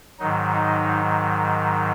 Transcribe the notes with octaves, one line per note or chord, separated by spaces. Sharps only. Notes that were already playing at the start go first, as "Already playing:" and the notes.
G#2 D#3 F#3 D#4
D#4